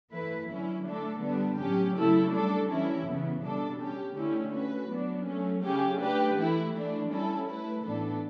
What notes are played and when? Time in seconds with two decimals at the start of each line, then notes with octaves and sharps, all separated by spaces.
0.12 E3 A3 E4 B4
0.49 D3 F#3 C#4 E4
0.85 D3 A3 D4 A4
1.22 D3 G3 B3 D4
1.59 A2 F#3 C#4 G4
1.96 C#3 F#3 A3 E4 A4
2.33 G3 D4 A4
2.69 E3 G3 C#4 E4
3.06 C#3 E3 B3
3.43 B2 G3 D4 A4
3.80 G3 C#4 G4
4.16 D3 A3 C#4 E4 G4
4.53 A3 C#4 F#4 B4
4.90 F#3 B3 D4
5.27 F#3 A3 C#4
5.63 C#3 F#3 C#4 G4
6.00 A3 D4 G4 B4
6.37 E3 A3 E4
6.74 E3 A3 D4
7.10 G3 C#4 E4 A4
7.47 A3 E4 B4
7.84 A2 E3 B3 D4 A4